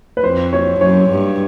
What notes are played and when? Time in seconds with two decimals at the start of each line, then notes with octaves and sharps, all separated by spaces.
0.17 B4
0.23 F2 C5
0.53 C#5
0.81 F#2 C#5
1.10 G2